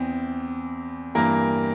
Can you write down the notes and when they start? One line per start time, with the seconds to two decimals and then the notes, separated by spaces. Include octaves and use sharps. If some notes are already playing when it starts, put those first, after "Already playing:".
Already playing: E2 E3 C4
1.15 G2 E3 A#3 A#4